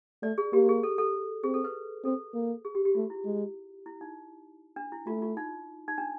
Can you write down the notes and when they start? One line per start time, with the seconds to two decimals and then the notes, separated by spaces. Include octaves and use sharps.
0.23 A3 D5
0.38 G#4
0.53 A#3 G4
0.69 G#4
0.83 A4
0.98 A4
1.44 C4 G#4
1.54 A4
1.64 B4
2.05 C4 A4
2.34 A#3
2.65 G#4
2.75 G4
2.85 G4
2.95 A3 F4
3.10 E4
3.25 G#3
3.86 E4
4.01 D#4
4.76 D4
4.92 E4
5.07 A3 F4
5.22 F4
5.37 D#4
5.88 D#4
5.98 D4